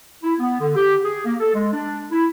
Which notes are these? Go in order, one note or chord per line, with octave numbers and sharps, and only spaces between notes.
E4
B3
D3
G4
G#4
A#3
A4
G#3
D4
E4